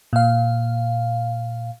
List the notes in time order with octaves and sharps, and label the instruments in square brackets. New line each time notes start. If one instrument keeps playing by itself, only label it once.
[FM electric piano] A#2 F5